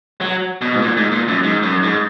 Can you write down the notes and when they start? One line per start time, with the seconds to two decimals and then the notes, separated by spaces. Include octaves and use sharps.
0.21 F#3
0.61 B2
0.75 G#2
0.82 A#2
0.97 G#2
1.12 A#2
1.28 F#2
1.43 G#2
1.63 F#2
1.83 G#2